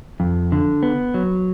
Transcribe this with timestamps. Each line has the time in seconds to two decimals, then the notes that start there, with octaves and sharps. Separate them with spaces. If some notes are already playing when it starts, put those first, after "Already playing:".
0.20 F2
0.52 D3
0.83 B3
1.14 F#3